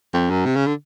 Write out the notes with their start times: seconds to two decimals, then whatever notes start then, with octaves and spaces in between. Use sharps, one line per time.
0.14 F2
0.30 F#2
0.45 C3
0.56 C#3
0.67 D3